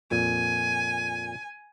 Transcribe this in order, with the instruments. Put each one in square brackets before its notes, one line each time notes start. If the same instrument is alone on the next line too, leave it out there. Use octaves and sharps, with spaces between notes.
[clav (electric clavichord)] F2 A#2 [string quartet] G#5